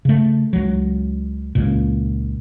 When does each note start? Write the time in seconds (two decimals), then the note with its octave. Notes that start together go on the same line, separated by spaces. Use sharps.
0.05 C#3 A3
0.53 C#2 F#3
1.55 C#2 A#2